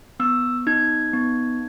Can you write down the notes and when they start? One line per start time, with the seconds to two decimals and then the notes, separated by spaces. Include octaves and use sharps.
0.20 B3 E6
0.67 D#4 G#6
1.13 B3